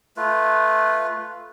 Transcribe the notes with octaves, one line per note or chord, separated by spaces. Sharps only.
A3 F4 B4